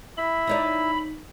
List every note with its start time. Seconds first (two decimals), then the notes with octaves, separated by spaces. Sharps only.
0.18 E4 E5 B5
0.47 D#4 C#5 D5